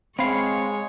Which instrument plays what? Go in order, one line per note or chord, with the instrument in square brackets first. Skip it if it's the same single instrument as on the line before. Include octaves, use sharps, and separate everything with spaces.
[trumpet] G#3 [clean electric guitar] C4 F5 [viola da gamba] C#5 [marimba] B5